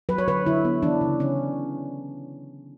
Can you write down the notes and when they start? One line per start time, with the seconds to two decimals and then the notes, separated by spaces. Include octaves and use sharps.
0.09 F#3 B4
0.18 C#5
0.28 D3 B4
0.46 D3 E4
0.65 B3
0.83 E3 D4
1.01 C#3
1.20 C#3 C#4